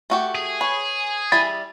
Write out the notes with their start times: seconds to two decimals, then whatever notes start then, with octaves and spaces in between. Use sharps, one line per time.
0.10 A3 F#4 G4
0.35 G#4
0.61 B4 C#5
1.32 G3 E4 B5 A6